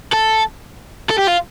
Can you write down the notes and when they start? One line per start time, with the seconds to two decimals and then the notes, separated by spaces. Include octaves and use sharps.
0.13 A4
1.11 A4
1.19 G4
1.28 F4